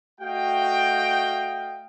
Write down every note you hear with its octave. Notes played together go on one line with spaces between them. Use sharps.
A3 F#4 D#5 F5 G5